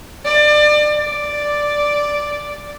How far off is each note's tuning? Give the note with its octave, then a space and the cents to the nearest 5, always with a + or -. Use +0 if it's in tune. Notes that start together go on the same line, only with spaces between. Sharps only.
D5 +30
D5 +0